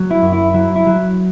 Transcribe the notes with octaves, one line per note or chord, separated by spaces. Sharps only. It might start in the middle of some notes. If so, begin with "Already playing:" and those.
Already playing: F#3
E4
F#2
E4
F#3 E4
E4
F#3